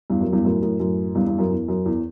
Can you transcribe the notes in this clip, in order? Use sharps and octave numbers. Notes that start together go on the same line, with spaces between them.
E2 G2
F#2
E2 G2
F#2 A2
F#2 A2
F#2 A2
E2 G2
E2 G2
F#2
E2
F#2
E2